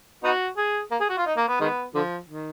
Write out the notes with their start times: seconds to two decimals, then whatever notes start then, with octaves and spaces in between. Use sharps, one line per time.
0.24 B3 D#4 F#4
0.57 G#4
0.91 A#3
1.00 G#4
1.09 F#4
1.18 F4
1.26 D#4
1.37 A#3
1.48 B3
1.60 D#3 G#3 B3
1.95 D3 F3
2.29 D#3